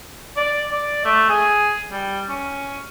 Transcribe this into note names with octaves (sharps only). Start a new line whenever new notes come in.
D5
D5
A3
G#4
G3
C#4